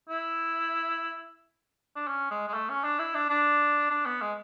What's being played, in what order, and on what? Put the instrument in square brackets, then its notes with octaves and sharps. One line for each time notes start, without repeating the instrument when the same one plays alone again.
[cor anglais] E4
D4
C#4
G#3
G#3
A3
C#4
D4
E4
D4
D4
D4
B3
G#3